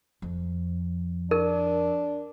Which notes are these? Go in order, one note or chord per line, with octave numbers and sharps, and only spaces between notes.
F2
D4 A#4